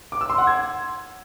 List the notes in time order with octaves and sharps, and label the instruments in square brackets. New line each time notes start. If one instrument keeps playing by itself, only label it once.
[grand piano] D6
E6
C6
F#5
G#6